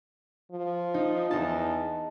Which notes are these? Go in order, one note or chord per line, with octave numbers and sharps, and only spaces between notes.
F3
D#4
E2 D#4 A5